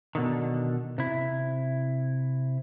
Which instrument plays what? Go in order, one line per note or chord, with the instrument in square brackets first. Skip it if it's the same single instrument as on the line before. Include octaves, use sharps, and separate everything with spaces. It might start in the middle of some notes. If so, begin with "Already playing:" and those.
[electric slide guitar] B2 D3 D#3
C3 E4